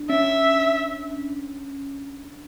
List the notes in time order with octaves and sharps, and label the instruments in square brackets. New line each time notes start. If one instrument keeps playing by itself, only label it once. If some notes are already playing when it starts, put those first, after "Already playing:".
Already playing: [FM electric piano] D4
[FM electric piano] C#4 [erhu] E5